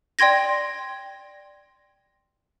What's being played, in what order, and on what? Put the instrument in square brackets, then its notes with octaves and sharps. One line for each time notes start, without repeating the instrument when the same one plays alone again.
[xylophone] D5 G5 C6 G#6 A#6